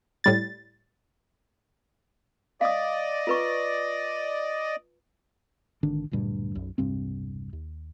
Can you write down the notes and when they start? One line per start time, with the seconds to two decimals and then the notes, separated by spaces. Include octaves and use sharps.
0.24 A2 G3 A6
2.61 D5 D#5 F5 D#6
3.27 F4 B4 C#6
5.83 G#1 D3 D#3 D4
6.11 D1 D2 G2 A#2
6.55 B1 F#2
6.78 E1 C2 G2 C4
7.53 D#2